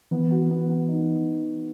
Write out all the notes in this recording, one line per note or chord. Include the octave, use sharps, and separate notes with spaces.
E3 B3
F#4
B3
B3
D#4